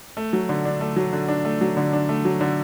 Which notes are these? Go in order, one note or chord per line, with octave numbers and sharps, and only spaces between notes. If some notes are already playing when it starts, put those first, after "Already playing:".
A3
F#3
D3
D4
A3
F#3
D3
D4
A3
F#3
D3
D4
A3
F#3
D3